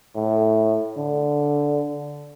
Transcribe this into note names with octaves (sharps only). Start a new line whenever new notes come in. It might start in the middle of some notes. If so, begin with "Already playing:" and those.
A2
D3